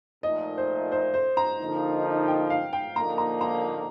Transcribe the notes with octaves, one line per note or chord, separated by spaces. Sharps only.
A#2 F3 A3 D#4 D#5
C5
C5
C5
A#5
D3 F3 A#3 D#4
G5
F5
G5
D3 F3 A#3 D#4 A#5
A#5
A#5